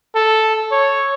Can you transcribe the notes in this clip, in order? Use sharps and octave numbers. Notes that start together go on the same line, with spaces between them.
A4
C#5